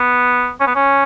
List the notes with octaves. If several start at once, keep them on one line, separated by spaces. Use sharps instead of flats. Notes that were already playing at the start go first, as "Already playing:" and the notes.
Already playing: B3
C#4
B3
C#4